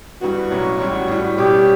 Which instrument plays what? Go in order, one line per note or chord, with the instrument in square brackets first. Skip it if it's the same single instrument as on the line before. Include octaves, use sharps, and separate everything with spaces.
[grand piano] G2 E3 G3 B3 [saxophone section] F#4
[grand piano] B1 A2 F#3 C#4
A1 A2 G3 C#4
A2 E3 G3
[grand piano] B2 G3 C#4 [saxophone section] G4